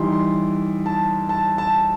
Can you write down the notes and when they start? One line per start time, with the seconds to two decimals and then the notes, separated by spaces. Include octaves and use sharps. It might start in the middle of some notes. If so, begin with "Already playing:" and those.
Already playing: E3 G3 D#4 C6
0.12 C6
0.86 A5
1.29 A5
1.58 A5